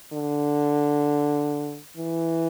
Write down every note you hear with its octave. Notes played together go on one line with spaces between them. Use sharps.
D3
E3